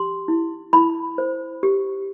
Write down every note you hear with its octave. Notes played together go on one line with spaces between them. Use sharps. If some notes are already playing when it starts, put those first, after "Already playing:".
Already playing: G4 C6
E4
E4 B5
C5
G4